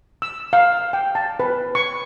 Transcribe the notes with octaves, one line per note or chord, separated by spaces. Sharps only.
E6
F5
G5
A5
B4
C#6